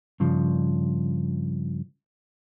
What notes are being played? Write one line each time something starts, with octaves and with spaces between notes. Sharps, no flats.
G2 C#3 F3